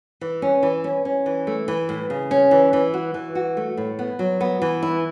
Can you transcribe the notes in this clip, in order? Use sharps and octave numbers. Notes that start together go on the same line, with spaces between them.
E3
C#4
E3
C#4
C#4
E3
A3
E3
A2
C#3
C#4
E3
E3
F#4
E3
F#4
A3
A2
B3
F#3
B3
E3
E4